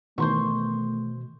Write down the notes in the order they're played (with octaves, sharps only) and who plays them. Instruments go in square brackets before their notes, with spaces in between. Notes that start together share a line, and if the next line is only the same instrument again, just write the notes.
[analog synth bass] B2 [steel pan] D#3 E3 [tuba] A3 [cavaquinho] C5 C6 C#6